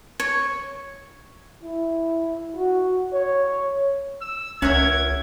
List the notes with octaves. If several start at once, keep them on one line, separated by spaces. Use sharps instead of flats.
C#5
E4
F#4
C#5
E6
C#2 C#4 A#4 C#5 E5 F#5 G#6